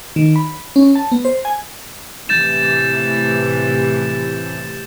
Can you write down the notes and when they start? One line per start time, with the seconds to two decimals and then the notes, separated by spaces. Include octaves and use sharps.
0.16 D#3
0.36 B5
0.76 C#4
0.95 A5
1.12 B3
1.25 C5
1.45 G#5
2.29 A2 C3 E3 G6 A6 E7